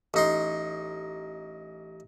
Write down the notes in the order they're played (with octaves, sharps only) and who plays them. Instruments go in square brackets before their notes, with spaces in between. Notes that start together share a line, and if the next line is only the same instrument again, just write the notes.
[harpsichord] A1 D#4 C6